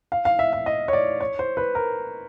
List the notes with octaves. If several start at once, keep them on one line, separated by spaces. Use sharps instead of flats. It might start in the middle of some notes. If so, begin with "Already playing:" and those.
F5
F5
E5
E5
D#5
C#5
D5
C#5
C5
B4
A#4